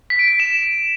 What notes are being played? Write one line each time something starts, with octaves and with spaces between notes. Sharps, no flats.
B6
D7
B6
E7